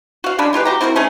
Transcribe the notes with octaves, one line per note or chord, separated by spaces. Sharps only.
F#4 F5
C#3 G#3 D4 B5
G#3 F4 G4 B4
F#4 G4 A#5
C4 E4 F#4 A#4
A3 C#4 D#4 G#4